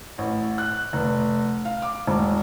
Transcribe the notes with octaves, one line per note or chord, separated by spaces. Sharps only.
A1
F#6
F1
F5
D6
E1